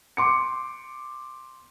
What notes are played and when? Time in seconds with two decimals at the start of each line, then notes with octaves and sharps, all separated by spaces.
0.17 C6 D6 C#7